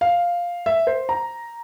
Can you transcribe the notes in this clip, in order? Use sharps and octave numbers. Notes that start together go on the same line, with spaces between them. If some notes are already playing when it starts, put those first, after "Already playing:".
F5
E5
C5
A#5